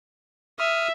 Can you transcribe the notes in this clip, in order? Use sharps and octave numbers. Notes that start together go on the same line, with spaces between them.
E5 D#6 F6